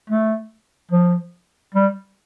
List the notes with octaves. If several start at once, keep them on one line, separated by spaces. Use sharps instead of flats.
A3
F3
G3